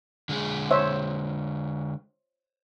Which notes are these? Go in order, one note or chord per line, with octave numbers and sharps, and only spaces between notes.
D3 G#3 G#4
C5 C#5 E5